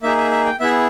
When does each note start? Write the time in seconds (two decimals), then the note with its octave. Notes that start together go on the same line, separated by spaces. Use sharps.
0.03 A#3 D#4 G#4 E5
0.17 E5
0.31 E5
0.46 G5
0.60 B3 E4 G#4 E5